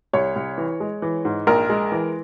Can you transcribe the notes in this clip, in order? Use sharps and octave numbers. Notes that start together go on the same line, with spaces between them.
C2 C#5
C2
E3
G#3
E3
G#2
A#1 A#4
G#3
E3